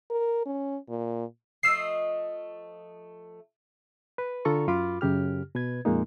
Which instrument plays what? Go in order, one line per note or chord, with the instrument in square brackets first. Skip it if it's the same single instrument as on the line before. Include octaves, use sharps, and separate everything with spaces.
[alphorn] A#4
C#4
A#2
[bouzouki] F3 A3 D#5 [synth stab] E6 C7
[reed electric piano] B4
D3 F4 A4 A#5 C#6
F#2 F4 B5 D6
F#2 C#3 G4 F6
B2 B4 G#6
F2 A#2 G#3 A#3 D#4